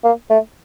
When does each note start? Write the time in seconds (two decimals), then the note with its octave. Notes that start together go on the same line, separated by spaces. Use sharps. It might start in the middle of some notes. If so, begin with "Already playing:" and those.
0.04 A#3
0.30 A3